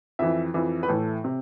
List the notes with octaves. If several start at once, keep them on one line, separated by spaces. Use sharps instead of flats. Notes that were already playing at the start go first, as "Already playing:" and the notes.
F2 E3 E5
F2 E3
B4
A2 E3 A4
C3